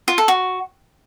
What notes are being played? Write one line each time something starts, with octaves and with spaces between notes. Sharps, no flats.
F4
A4
F#4